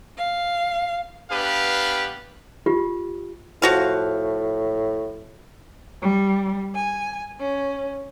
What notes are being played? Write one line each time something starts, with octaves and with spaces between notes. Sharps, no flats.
F5
B3 D4 G4 B4 F5
F4 G4
A2 F3 F#4 F5
G3
G#5
C#4